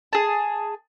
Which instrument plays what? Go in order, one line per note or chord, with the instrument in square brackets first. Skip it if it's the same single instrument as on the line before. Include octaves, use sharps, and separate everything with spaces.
[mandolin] G#4 A5